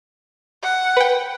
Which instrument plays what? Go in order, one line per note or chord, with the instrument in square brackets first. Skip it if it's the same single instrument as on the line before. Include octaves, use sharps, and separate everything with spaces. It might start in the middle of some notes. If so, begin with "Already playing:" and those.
[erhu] F#5
[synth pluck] B4 G5